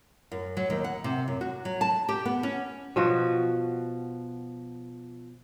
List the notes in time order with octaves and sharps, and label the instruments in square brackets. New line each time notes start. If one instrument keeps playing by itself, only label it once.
[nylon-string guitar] F#2
F#3
D#2
F#5
C3
F#2
F#4
F#3
A5
G4
B3
C#4
[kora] B2 F3 F#4